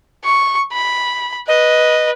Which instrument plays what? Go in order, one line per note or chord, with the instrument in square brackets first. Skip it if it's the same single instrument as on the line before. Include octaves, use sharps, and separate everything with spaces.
[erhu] C#6
B5
[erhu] B4 [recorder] D#5